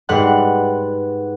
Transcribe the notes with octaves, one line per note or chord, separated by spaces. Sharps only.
G#2 G3 B4 F#5 C6 F#6